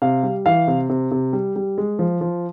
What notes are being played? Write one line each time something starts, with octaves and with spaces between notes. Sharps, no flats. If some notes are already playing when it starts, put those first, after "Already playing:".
C3 F5
G3
E3 F5
C3
C3
C3
G3
G3
G#3
F3
F3